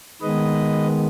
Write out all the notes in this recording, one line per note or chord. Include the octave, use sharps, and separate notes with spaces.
D#3 G#3 B3 B4 D#5